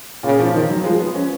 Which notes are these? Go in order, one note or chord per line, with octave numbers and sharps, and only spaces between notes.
A#2 C#3
F3
D#3 F3
F#3
F3 G#3
B3
C#4